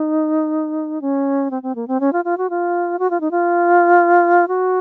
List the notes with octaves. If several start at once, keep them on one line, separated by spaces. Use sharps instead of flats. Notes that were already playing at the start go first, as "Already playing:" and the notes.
Already playing: D#4
C#4
C4
C4
A#3
C4
C#4
F4
F4
F#4
F4
F#4
F4
D#4
F4
F#4